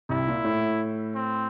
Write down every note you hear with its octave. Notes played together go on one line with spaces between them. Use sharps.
C2 C3 E4
A#2
A2
C4